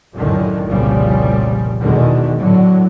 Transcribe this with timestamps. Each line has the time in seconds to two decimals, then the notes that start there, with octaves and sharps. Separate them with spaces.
0.15 C#2 F#2 A2 D3 D#3
0.66 F1 C2 A#2 C#3 F3 G3
1.80 E2 B2 D3 D#3 G#3
2.38 A2 D3 F#3